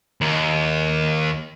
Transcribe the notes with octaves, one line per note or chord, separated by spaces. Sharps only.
D#2